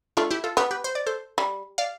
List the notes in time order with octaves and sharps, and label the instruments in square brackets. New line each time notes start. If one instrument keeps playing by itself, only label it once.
[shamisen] A3 [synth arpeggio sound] D4 F4
[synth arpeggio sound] E4 G4
F4 A4
[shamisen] B3 [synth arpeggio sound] G4 B4
[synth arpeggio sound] G4 B4
C5
D5
A4 C5
[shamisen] G3
[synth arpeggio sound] D5 F5